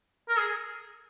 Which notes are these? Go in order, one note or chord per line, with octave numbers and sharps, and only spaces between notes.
A#4
G#4